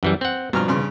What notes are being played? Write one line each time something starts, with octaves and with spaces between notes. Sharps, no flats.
F#2 E3 G3
C4 F#5
G2 B2 F3 A#5 F6
G2 C#3 C6